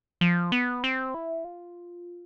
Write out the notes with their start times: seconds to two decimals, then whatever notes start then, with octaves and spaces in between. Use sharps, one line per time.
0.21 F3
0.52 B3
0.84 C4
1.14 E4
1.44 F4